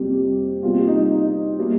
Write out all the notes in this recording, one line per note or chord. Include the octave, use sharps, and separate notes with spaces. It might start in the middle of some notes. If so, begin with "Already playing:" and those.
Already playing: F2 C3 G3 A#3 G4
C3 G3 A#3 F4
D#4
D#4
G3 A#3